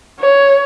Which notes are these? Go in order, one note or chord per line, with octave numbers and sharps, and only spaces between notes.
C#5